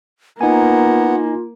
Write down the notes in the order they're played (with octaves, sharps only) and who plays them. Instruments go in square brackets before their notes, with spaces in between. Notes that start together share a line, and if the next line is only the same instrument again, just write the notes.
[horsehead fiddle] A#3 [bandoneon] B3 [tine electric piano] D#4 G#5 [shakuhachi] F4